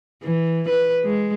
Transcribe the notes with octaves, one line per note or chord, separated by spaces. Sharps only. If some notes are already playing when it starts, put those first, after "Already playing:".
E3
B4
G#3